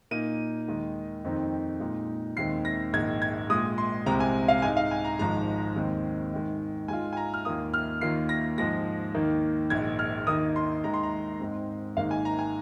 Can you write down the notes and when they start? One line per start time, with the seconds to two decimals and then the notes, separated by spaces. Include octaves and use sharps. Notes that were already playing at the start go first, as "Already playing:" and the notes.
0.11 A#2 A#3 D#4 D#7
0.68 D#2 D#3 G#3 D#4
1.24 F2 D#3 C4 D#4
1.80 A#2 G#3 D#4
2.37 D#2 D#3 G#3 C4 C7
2.65 A#6
2.93 A#1 G#2 D#3 G#6
3.22 G#6
3.50 A#1 A#2 G#3 D#6
3.78 C6
4.06 C2 C3 G#3 C4 A#5
4.20 G#5
4.48 F5
4.62 G#2 G#3 D#4 G#5
4.77 F5
4.91 G#5
5.05 A#5
5.19 G#1 G#2 F3 G#3 A#5
5.76 D#2 D#3 G#3 C4
6.32 G#2 D#3 G#3
6.88 G#2 G#3 F4 G#5
7.13 G#5
7.17 A#5
7.34 F6
7.45 D#2 D#3 A#3 F4 D#6
7.74 F6
8.01 D#2 D#3 A#3 F4 C7
8.29 A#6
8.58 G#2 F3 G#3 A#6
9.14 D#2 D#3 A#3 D#4
9.70 A#1 G#2 D#3 G#6
9.99 F6
10.27 D#2 D#3 A#3 D#4 D#6
10.56 C6
10.84 D#2 D#3 G#3 D#4 A#5
10.94 C6
11.03 A#5
11.40 G#2 G#3 C4
11.97 G#1 G#2 D#3 A#3 D#4 F5
12.11 G#5
12.25 A#5
12.39 G#5